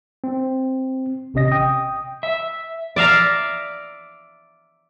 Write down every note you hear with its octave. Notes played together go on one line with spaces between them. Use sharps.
C4
A1 C3 C#4 D#5 A#6
G5 D#6
E5
D5 E5 F5 A#5